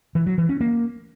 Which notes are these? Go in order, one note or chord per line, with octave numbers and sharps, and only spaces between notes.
E3
F#3
E3
C#4
A#3